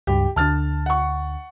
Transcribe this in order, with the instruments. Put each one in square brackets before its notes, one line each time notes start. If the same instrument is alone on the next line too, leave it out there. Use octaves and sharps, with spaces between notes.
[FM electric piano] C#2 G2 [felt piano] G4
[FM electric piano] D2 D3 [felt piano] A5 F6 A6
[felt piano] F#5 C#6